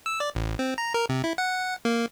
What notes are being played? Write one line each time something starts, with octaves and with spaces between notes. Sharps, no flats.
E6
D5
A1
C4
A#5
A#4
C3
E4
F#5
A#3